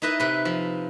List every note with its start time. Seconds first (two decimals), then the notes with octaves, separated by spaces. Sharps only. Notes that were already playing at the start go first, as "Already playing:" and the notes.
0.02 D#4 E4 B4 D#5 E5
0.20 C3 B4
0.45 F3